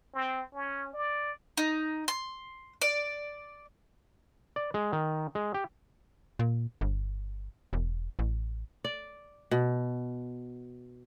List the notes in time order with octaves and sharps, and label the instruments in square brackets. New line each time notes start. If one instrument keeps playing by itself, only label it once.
[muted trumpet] C4
C#4
D5
[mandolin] D#4
C6
D5
[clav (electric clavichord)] D5
G#3
D#3
G#3
G4
[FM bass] A#2
G1
E1
A1
[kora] D5
B2